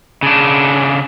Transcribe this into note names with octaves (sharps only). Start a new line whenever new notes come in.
C#3 D4